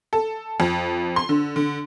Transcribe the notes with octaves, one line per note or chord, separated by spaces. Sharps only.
A4
F2
C6
D3
D3